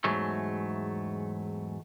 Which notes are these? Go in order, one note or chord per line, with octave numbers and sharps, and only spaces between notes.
E2 G#2 F#3 A3